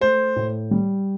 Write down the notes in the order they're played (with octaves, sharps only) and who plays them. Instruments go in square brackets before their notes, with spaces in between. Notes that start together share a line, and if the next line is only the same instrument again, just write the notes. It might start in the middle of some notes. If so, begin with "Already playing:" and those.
[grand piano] A3 [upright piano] C5
[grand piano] A2
G3